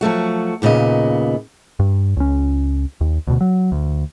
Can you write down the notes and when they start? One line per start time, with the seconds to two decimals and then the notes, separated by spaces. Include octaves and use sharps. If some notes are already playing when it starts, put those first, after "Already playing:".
0.01 F3 F#3 A3 F#4
0.62 D#2 A#2 C#3 B3 D#5
1.79 G2
2.17 C#2 C#4
3.01 D#2
3.27 D2 B2
3.41 F#3
3.72 D2